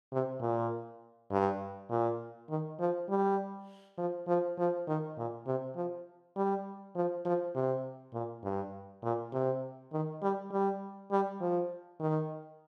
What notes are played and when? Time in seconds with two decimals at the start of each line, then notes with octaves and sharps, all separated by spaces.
0.12 C3
0.41 A#2
1.31 G2
1.90 A#2
2.49 D#3
2.79 F3
3.09 G3
3.98 F3
4.27 F3
4.58 F3
4.87 D#3
5.17 A#2
5.46 C3
5.76 F3
6.36 G3
6.95 F3
7.25 F3
7.55 C3
8.14 A#2
8.43 G2
9.03 A#2
9.32 C3
9.92 D#3
10.22 G3
10.52 G3
11.11 G3
11.41 F3
12.00 D#3